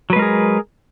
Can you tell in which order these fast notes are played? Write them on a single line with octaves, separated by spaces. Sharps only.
F#3 B4 G#3 A#4 G#4